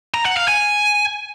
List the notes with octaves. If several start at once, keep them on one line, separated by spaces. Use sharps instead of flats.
A#5
F#5
F5
G#5